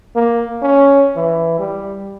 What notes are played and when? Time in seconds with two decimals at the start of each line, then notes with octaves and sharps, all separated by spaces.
0.15 A#3
0.62 C#4
1.16 E3
1.59 G3